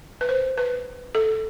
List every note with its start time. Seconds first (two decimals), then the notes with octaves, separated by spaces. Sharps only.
0.21 B4
0.29 C5
0.58 B4
1.15 A4